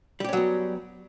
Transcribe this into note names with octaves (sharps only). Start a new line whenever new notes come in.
F#3 G3 B3 C#4 G4